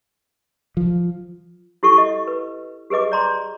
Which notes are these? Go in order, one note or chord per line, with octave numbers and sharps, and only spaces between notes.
F3
E4 G4 A4 C#6
D#5
B4
G4 G#4 B4 D#5 D6
D5 A#5 C6